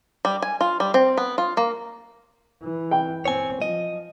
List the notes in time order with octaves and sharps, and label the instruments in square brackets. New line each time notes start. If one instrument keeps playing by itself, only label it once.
[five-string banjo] G3
G#5
F4
G3
C4
B3
F4
A#3
[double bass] E3
[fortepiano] G5
[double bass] C4 [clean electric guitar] C#5 G#5
[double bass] F3 [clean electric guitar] D#5